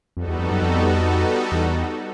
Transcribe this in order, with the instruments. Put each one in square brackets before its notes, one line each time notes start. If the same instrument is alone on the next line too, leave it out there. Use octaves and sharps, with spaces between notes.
[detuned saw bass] F2 [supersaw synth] G3 B3 D#4 F#4 A4
[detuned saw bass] E2
F2
F#2
F2
E2